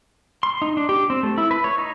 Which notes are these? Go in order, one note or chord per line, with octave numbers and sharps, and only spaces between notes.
C6
D#4
D4
G4
C4
A3
E4
B4
C#5
D#4